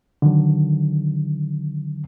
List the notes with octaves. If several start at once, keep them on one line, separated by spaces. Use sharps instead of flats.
D3 D#3 F#3